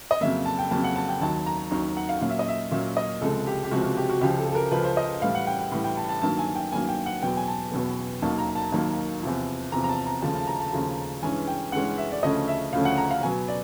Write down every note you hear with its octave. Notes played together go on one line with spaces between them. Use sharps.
D#5
F2 C#3 F#3 A#3 E5
A5
G5
F2 C#3 F#3 A#3 A5
F#5
A5
G5
D#2 D#3 F#3 A5
A#5
D#2 D#3 F#3
F#5
F5
A#2 F#3 A#3 C#4 F5
E5
D#5
E5
A#2 F#3 A#3 C#4 E5
D#5
C#2 C3 F3 G#3 A4
G4
G4
C#2 C3 F3 G#3 F#4
F#4
G4
F#4
C#2 C#3 F3 G4
A4
A4
A#4
C#2 C#3 F3 B4
C5
D#5
A2 E3 G3 F5
F#5
G5
G5
A2 E3 G3
G5
A5
A5
G2 D#3 F#3 A#3 A5
G#5
G5
G2 D#3 F#3 A#3 G#5
G5
F#5
E2 B2 F#3 B3 G5
G#5
A5
E2 B2 F#3 B3
D#2 D#3 F#3 A#3 A5
A#5
A5
D#2 D#3 F#3 A#3
E2 C3 F3
E2 C3 F3 A#5
A#5
A5
A#5
D#2 C#3 F3 A3 A5
A5
A#5
A5
D#2 C#3 F3 A3
G2 E3 G#3 C#4 G#5
G5
G2 E3 G#3 C#4 F#5
E5
D5
D2 C#3 F3 A3 C#4 D#5
E5
D2 C#3 F3 A3 C#4 F5
F#5
A#5
F5
B2 F#3 B3 G#5
D5